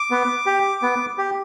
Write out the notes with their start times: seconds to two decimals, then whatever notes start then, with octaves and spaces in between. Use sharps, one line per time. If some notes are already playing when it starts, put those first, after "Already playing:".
Already playing: D6
0.11 B3
0.46 G4
0.82 B3
1.18 G4